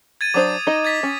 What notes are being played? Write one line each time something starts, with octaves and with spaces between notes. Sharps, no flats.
G#6 A6 D#7
F#3 D4 C5 D6 D#6
D#4 D#5
G#6 A6 B6
C#4